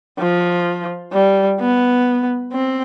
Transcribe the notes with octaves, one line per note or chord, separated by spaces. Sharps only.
F3
G3
B3
C4